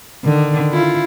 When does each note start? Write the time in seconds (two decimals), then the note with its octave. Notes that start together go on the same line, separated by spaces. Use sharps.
0.25 D3 D#3
0.72 E4 F4